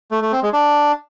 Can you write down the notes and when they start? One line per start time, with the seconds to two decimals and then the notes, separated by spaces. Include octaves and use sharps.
0.11 A3
0.22 A3
0.32 C4
0.43 G#3
0.53 D4